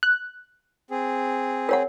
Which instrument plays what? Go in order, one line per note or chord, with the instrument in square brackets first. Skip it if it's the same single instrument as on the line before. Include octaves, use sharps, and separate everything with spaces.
[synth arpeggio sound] F#6
[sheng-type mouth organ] C4 G#4
[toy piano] A#4 C#5 F#5